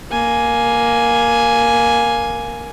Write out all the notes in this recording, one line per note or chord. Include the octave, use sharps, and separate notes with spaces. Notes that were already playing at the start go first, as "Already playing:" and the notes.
A#3 G#5